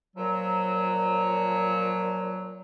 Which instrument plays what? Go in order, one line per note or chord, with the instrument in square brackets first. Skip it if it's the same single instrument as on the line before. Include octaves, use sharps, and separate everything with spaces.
[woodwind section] A#2 F3 F#3